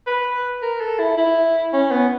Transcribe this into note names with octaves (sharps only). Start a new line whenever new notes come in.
B4
A#4
A4
E4
E4
C#4
B3